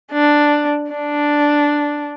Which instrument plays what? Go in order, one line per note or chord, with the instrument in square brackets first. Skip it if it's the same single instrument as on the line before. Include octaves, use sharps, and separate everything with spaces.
[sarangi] D4
D4